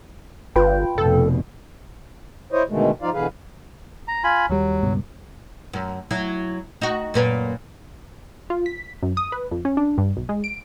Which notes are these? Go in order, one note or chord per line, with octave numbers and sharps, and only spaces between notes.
G1 F4 B4 G5
F1 B2 A4
E4 C5 C#5 D#5
B2 D3 D#3 G#3 A3
F3 D#4 F4 D5 F5
B2 D3 E3 G#4 B4 F5
A#5
F4 G#5 B5
D#2 F#3 G3
C#2 G2 B2
F#2
F#3 E4
D#4 F#4
F#2 A#2 B4
F4
B6
F#2
D#6
B4
F2
C#4
D4
G2
B1
G#3
D7